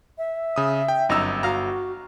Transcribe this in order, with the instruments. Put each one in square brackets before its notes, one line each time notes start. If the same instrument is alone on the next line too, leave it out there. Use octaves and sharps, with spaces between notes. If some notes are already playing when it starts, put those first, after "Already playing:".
[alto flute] E5
[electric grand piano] C#3 D#6
G5
[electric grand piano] G1 E6 [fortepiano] F#2 D#4 A#5
[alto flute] F#4 [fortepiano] F5 A#5